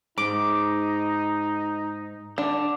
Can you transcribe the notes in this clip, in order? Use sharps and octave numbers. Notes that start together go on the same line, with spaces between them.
G#2 D#4 D6
D3 D4 D6